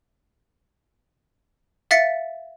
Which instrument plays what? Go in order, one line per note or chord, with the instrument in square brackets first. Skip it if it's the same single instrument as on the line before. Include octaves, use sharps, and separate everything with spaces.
[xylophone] E5 F5 A6 B6 C#7